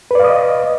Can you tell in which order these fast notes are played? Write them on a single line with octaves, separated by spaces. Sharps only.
B4 D5 F5 D#6 D#5